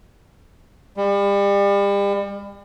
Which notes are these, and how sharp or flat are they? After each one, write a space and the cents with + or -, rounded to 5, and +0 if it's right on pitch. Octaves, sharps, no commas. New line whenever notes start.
G3 +35